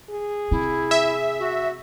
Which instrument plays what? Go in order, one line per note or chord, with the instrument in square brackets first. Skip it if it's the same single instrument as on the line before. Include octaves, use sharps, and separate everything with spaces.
[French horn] G#4
[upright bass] C3 [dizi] E4
[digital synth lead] E5
[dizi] F#4